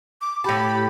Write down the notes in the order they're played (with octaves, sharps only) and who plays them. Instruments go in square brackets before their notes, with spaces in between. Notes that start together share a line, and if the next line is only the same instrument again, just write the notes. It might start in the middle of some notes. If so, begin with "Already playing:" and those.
[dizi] D6
[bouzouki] A2 A5 [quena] G4 [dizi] B5